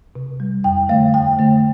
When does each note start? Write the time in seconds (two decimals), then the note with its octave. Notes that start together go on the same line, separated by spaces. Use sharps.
0.15 C3
0.40 G3
0.64 F2 G5
0.89 D3 A3 F5
1.14 F2 G5
1.39 D3 A3